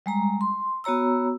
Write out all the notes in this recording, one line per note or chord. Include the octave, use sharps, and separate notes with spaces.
G3 G#3 A#5
C6
B3 F#4 C#5 A#5 E6